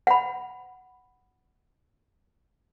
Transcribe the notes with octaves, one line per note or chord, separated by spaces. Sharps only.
F#5 B5